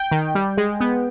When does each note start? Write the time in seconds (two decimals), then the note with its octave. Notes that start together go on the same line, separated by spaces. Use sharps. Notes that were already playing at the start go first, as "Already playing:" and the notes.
Already playing: G5
0.11 D#3
0.35 G3
0.58 G#3
0.80 B3